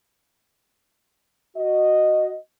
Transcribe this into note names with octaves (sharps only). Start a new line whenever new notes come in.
F#4 D#5